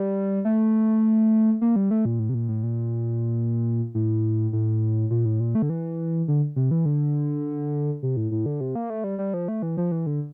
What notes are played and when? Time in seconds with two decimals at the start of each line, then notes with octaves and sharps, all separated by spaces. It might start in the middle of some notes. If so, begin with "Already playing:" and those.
Already playing: G3
0.45 A3
1.61 A#3
1.76 G3
1.91 A3
2.05 A#2
2.19 A2
2.29 C3
2.34 A#2
2.48 A2
2.63 A#2
3.94 A2
4.53 A2
5.11 A#2
5.25 A2
5.40 A#2
5.55 A3
5.62 D3
5.70 E3
6.28 D3
6.56 C3
6.71 E3
6.85 D3
8.03 C3
8.17 A2
8.31 A2
8.46 D3
8.61 C3
8.75 A#3
8.90 A3
9.04 G3
9.19 G3
9.34 F3
9.48 A3
9.62 E3
9.77 F3
9.92 E3
10.06 D3